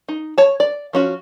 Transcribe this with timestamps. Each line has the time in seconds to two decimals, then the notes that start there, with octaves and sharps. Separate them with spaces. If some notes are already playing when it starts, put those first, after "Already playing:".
0.09 D#4
0.38 C#5 A5
0.60 D5
0.93 F3 C#4 F#4